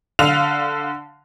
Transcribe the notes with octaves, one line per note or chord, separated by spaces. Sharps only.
D3 F5 F7